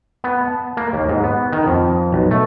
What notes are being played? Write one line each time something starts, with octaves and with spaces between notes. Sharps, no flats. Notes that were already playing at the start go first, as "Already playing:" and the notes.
B3
A5
A#3
D#2
G#2
B3
D#3
F2
B1
A3